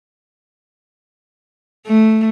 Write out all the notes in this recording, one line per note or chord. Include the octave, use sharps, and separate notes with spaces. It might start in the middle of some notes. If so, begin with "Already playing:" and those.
A3